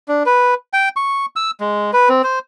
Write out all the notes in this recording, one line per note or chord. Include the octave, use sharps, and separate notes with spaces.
D4
B4
G5
C#6
E6
G#3
B4
C4
C5